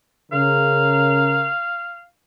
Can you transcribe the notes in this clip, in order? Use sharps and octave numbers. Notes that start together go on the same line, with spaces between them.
C#3 A#4 F5